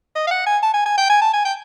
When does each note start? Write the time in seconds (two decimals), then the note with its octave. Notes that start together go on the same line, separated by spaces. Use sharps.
0.16 D#5
0.27 F5
0.31 F#5
0.47 G#5
0.63 A5
0.74 G#5
0.86 G#5
0.98 G5
1.10 G#5
1.22 A5
1.34 G#5
1.45 G5